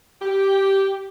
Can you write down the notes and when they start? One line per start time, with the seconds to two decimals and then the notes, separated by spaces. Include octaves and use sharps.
0.22 G4